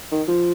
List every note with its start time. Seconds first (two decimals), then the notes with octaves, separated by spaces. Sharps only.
0.12 D#3
0.28 F3